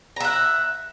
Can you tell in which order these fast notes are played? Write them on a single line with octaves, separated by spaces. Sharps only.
A#5 E5 F#5